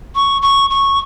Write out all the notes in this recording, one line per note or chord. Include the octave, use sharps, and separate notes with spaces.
C#6
C#6
C#6